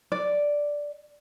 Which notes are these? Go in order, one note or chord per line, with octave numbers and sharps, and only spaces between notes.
D5